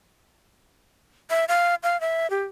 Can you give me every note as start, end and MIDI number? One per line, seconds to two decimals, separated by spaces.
1.30 1.45 76
1.48 1.75 77
1.83 1.99 77
2.01 2.30 76
2.30 2.42 67